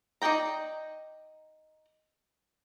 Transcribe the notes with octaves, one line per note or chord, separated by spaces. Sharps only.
D#4 A#4 D5 G5 A#5